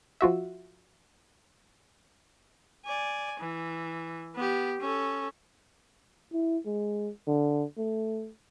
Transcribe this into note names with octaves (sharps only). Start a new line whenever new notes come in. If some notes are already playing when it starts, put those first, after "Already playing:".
F3 F4 F#4 E5
D5 G#5
E3
B3 G4
C#4 A4
E4
G#3
D3
A3